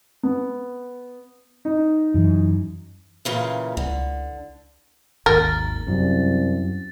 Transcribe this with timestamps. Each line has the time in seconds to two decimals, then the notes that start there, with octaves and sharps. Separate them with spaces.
0.23 B3
1.65 D#4
2.14 F#2 E3
3.25 A#2 C#3 E3
3.77 C#2 D3
5.26 G#1 D#2 A#4 A6
5.87 C2 F#2